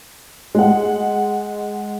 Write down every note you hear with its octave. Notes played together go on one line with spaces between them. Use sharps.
G#3 F#5